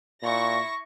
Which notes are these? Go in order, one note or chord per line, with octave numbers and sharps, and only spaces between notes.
A#2 E4 C#6 A#6